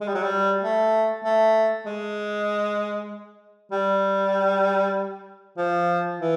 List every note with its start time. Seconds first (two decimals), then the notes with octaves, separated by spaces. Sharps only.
0.01 G#3
0.07 G3
0.14 F#3
0.23 G3
0.63 A3
1.24 A3
1.86 G#3
3.71 G3
5.57 F3
6.20 E3